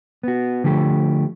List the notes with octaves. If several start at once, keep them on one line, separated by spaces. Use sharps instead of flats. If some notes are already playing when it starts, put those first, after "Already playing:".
B3 F#4
D3 F3 A3 G4